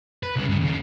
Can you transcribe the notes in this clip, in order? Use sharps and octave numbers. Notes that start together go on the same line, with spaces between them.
B4
C2 C#3
G2 C#3
D#2 C#3